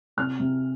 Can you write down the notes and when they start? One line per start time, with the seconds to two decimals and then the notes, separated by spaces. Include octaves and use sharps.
0.17 C3 F6
0.39 C3